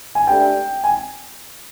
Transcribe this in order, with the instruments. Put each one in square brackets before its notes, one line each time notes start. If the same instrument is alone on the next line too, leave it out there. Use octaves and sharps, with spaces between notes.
[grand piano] G#5
[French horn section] A3 D4 G4 B4 D5 [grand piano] G5
[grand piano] G#5